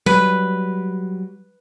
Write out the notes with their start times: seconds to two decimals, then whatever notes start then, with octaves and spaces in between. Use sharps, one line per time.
0.06 F#3 G3 B4